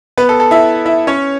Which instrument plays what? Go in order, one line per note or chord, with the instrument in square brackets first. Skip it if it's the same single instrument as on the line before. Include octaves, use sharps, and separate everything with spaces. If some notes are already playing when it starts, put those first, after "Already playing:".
[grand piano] B3 B4
A4
A4
E4 E5
E4 E5
C#4 C#5